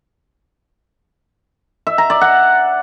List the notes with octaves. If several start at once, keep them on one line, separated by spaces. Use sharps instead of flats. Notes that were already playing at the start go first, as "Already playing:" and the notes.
E5
A#5
D5
F#5